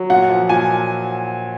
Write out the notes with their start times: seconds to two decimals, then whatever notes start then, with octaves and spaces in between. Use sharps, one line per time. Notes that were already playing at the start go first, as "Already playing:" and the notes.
Already playing: F#3
0.10 A#2 F#5
0.29 F3
0.49 A#2 G#5